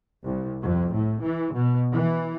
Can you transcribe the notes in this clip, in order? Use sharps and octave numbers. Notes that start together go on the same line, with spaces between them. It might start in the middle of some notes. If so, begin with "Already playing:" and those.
C2
F2
A2
E3
B2
E3